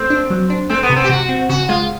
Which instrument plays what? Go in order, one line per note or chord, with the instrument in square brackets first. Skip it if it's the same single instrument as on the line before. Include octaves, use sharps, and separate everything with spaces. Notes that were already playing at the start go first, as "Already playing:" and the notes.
Already playing: [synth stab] A3 [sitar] C4
[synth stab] D4
F#3
D4
[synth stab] A3 [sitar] C4
[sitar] B3
[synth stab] C3
[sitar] C4
G4
[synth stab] C3 [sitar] F#4
[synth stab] C4
[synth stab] C#3 [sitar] F#4
[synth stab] G#3 [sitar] F4